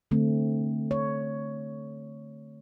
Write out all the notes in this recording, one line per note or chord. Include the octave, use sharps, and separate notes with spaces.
D3 A3 C4
C#5